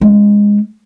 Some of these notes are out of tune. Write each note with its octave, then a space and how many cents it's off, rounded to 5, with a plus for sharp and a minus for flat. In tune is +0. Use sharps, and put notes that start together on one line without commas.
G#3 -15 C#4 +0